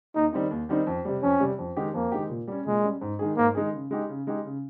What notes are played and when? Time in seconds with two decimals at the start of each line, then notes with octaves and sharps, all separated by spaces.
0.15 D#2 D#4
0.33 D#3 G3 C4 D#4
0.51 D#2
0.69 D#3 G3 C4 D#4
0.86 F2
1.05 C3 G3
1.22 F2 C#4
1.40 C3 G3
1.58 F2
1.77 D#3 G#3 D#4 G4
1.94 F2 A#3
2.12 D#3 G#3 D#4 G4
2.29 A#2
2.48 G3 C#4
2.66 A#2 G#3
2.84 G3 C#4
3.01 G#2
3.19 D#3 G#3 D#4 G#4
3.37 G#2 A#3
3.55 D#3 G#3 D#4 G#4
3.73 C#3
3.91 G#3 D#4 G4
4.09 C#3
4.27 G#3 D#4 G4
4.45 C#3